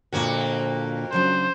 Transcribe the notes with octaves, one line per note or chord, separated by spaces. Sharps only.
F2 A#2 D3 A#3 F#4
C#3 F#3 D4 C5